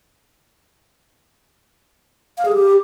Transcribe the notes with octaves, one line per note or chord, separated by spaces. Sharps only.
F5
G#4
G4